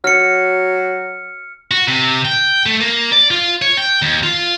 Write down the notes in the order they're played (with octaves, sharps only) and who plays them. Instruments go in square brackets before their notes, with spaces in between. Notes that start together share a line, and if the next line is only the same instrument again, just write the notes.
[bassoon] F#3 [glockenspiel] F6 C#7
[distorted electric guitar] F#4
C3
G5
A3
A#3
D5
F4
C#5
G5
D#2
F4